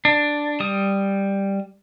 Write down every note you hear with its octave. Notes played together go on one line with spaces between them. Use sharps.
D4
G3 D#6